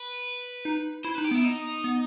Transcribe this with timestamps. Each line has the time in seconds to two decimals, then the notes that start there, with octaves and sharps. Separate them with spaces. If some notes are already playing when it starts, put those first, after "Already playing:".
Already playing: B4
0.65 D#4
1.05 E4 C5
1.15 D#4 B4
1.24 G4
1.31 B3 E4
1.44 D#4
1.84 B3